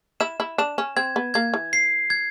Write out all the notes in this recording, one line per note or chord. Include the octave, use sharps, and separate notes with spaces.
E4 E7
E4
D4 E7
C#4
C4 G#6
B3
A#3 G#6
E3
C7
G#6